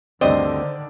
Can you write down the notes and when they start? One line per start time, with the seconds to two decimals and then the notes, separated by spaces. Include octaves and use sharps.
0.21 D2 G2 D3 D#3 C4 C5 D5 D#5